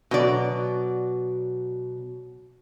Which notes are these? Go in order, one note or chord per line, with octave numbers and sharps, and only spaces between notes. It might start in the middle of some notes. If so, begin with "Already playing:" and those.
B2 F#3 D5